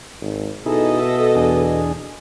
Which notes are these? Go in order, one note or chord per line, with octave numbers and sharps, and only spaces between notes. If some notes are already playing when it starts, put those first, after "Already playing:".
G#1
B2 D#4 E4 G#4 A4 D#5
E5
E2 D4 G#4